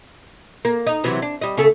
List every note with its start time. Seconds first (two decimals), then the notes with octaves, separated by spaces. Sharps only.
0.65 A#3
0.87 D#4
1.04 C3 E3 F#3
1.22 D4
1.41 G3 D#5
1.57 C#3 A3 A4